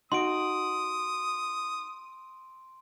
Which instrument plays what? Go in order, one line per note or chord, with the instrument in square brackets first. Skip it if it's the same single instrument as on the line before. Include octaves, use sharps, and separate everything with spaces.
[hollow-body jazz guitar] D#4 F#4 [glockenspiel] C6 D7 [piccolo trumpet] D#6